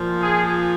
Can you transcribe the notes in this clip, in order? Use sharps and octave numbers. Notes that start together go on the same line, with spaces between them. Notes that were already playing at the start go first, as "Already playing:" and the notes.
Already playing: A#2 F3
G#4